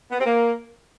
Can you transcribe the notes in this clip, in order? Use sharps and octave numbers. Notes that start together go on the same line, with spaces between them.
B3
C4
A#3